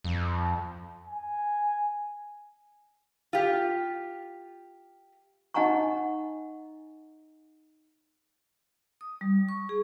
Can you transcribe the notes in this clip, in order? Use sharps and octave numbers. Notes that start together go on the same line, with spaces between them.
F2
G#5
F4 G4
D#4 D#5 F#5 G#5 A#5 C#6
D#6
G3
C#6
G#4